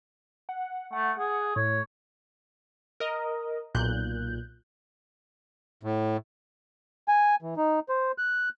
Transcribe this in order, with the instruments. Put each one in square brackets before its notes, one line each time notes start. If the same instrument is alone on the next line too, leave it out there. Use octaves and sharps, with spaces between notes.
[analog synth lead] F#5
[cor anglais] A3 [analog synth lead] F#5
[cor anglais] G#4
[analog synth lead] A2 [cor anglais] C#5
[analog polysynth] A#4 D#5
B1 A#2 F#6 G6
[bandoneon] A2
[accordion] G#5
E3
D#4
C5
F#6